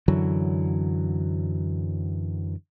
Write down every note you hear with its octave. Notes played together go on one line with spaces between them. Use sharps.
F#2 D3 E3 F#3